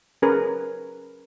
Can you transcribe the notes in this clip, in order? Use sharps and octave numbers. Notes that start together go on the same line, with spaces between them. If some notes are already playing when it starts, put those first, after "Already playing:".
C#4 G#4 A#4 B4